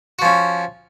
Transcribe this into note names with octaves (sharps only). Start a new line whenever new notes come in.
F3 C#4 F#4